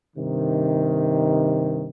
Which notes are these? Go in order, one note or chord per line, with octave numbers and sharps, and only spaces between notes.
G2 C3 D#3